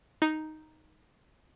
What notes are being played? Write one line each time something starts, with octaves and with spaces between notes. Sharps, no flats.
D#4